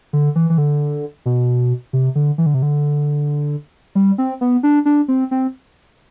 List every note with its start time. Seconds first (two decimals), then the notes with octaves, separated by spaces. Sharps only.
0.13 D3
0.36 E3
0.50 E3
0.58 D3
1.26 B2
1.93 C3
2.15 D3
2.38 E3
2.46 D3
2.54 C3
2.62 D3
3.95 G3
4.18 C4
4.41 B3
4.63 D4
4.86 D4
5.08 C4
5.31 C4